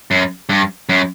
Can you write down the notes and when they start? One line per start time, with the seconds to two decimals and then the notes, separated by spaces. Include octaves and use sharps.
0.11 F#2
0.49 G2
0.89 F#2